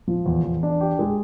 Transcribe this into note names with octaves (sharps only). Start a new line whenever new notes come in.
F3
E2
E2
D4
G4
G#3